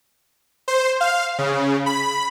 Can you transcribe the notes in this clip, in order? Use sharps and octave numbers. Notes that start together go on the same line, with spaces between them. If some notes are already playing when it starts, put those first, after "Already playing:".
C5
F5
C#3
B5